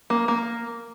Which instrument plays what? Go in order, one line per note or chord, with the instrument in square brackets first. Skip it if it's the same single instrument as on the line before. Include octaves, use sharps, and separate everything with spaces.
[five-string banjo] A#3
A#3